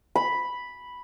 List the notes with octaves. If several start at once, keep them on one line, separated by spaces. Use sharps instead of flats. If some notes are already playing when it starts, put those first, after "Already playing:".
B5